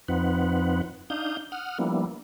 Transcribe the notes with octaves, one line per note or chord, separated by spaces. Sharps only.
F2 F3 C4 D#4 B4 F#5
D4 D#4 F5 D#6 G6
F#5 D#6 F6
F3 G3 A#3 B3 D4 E4